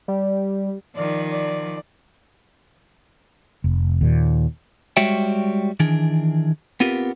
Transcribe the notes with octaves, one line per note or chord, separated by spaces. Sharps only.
G3
D#3 F3 D5
D5
F1
D#2 A#2
G3 G#3 F#4 C#5 E5 G5
D#3 E3 D4 G#4
B3 C4 F4 G4 A#4